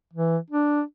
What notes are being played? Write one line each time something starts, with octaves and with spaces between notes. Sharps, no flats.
E3
D4